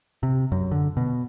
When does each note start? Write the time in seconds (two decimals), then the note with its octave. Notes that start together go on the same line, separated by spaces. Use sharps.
0.23 C3
0.52 F#2
0.71 D3
0.97 B2